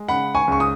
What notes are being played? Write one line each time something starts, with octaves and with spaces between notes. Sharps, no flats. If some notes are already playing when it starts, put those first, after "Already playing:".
Already playing: G#3
C#3 F#5 B5
G#5 C#6
C#2 C#6
D#6